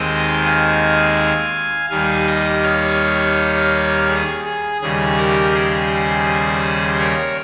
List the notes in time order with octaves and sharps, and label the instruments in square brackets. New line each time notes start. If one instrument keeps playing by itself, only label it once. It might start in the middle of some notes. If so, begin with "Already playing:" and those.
Already playing: [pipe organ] D#2 D#3 G#3 C4 D#5 G5
F5 G#5
D#2 D#3 G3 F5 G#5
D#5 G5
C#5 F5
G#4
G#4
D#2 C#3 G3 G#4
G4 A#4
G#4 C5
A#4 C#5